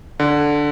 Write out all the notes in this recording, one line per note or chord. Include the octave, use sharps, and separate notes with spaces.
D3